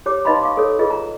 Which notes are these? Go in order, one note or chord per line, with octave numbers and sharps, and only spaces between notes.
G4 C#5 D6
D#4 B4 D#5 F5 B5 C6
F5 C#6 D6
A4 A#4 C#5
F4 G#4 B4 D#5
A#5